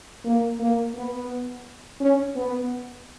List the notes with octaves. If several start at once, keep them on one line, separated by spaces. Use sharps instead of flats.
A#3
A#3
B3
C#4
B3